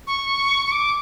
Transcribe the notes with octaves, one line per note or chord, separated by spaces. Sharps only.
C#6
C#6
D6